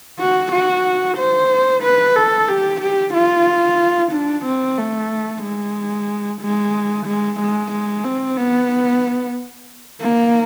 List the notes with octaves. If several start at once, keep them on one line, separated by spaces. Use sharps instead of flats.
F#4
F#4
C5
B4
A4
G4
G4
F4
D4
C4
A3
G#3
G#3
G#3
G#3
G#3
C4
B3
A#3